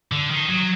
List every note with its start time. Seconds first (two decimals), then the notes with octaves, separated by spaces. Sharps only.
0.12 D3
0.30 D#3
0.50 F#3